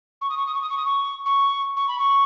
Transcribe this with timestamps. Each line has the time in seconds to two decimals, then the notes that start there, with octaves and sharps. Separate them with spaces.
0.21 C#6
0.30 D#6
0.37 C#6
0.46 D#6
0.54 C#6
0.61 D#6
0.70 C#6
0.77 D#6
0.85 C#6
1.26 C#6
1.77 C#6
1.88 B5
1.99 C#6